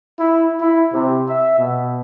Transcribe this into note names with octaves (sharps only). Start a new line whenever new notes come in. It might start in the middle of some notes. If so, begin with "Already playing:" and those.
E4
E4
C3
E5
B2